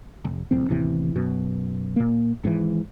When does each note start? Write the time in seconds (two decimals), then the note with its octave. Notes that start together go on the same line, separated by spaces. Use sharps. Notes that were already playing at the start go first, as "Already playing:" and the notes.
0.25 F1
0.51 D1 C2 F2 C4
0.69 A1 D#2 C3 E3
1.15 F#2 B2
1.96 A#2 A#3
2.44 G#1 G#2 D#3 E3